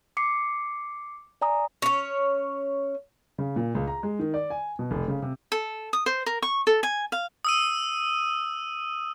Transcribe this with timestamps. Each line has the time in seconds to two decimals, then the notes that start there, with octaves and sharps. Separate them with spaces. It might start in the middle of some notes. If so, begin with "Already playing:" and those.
0.17 D6 C7 C#7
1.42 D5 G#5 A#5 D#6
1.82 C#4 C#5
3.38 C#3
3.56 A#2
3.75 C#2
3.87 A#5
4.03 G#3
4.19 D#3
4.34 D5
4.50 G#5
4.79 B2
4.91 F1
5.08 C#3
5.22 C3
5.52 A4
5.93 D#6
6.06 C5
6.26 A#4
6.42 C#6
6.67 A4
6.83 G#5
7.12 F5
7.45 D#6 E6 D#7